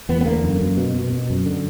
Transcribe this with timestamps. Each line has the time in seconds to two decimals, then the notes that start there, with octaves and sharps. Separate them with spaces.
0.09 E2 B3
0.21 B3
0.25 D3 A#3
0.44 F#2
0.61 F#2
0.77 B2
0.95 B2
1.13 B2
1.30 F#2
1.46 D3